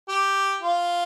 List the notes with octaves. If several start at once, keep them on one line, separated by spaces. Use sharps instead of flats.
G4
F4